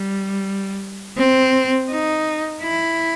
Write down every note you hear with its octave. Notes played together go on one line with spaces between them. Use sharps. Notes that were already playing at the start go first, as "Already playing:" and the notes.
Already playing: G3
C4
D#4
E4